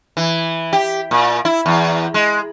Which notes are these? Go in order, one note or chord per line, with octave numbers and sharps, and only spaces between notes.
E3
G4
A#2
E4
E2
G#3